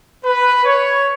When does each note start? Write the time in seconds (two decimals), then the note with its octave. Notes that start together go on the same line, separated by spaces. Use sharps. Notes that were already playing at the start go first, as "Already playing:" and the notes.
0.25 B4
0.65 C#5